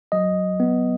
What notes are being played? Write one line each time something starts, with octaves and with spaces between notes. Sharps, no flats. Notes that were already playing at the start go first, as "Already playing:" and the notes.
F#3 D#5
B3